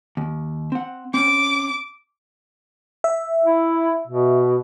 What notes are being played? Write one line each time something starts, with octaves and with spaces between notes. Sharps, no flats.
D#2
C4 F#5
C4 C#4 D6
E5
E4
B2